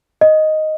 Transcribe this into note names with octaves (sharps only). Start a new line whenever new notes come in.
D#5